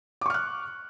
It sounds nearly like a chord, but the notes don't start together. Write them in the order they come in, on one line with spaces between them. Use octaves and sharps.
D6 C#6 F6 F#6